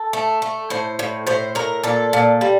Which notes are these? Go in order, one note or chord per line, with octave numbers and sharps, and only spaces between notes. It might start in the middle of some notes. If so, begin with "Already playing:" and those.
Already playing: A4
A3
A3
A2 C5
A2
A2 C5
A2 A#4
A#2 A4
A#2
G3